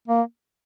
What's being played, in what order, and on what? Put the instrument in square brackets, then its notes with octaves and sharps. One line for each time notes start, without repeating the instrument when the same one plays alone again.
[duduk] A#3